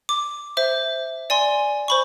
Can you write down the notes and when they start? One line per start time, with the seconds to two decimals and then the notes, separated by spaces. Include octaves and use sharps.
0.09 D6
0.57 C5 E5
1.30 D5 G#5 C6
1.88 C5 B5 C#6